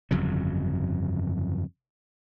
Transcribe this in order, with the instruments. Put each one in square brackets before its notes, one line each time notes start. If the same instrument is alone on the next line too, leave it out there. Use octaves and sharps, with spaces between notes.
[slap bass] G1 F2 C#3 F#3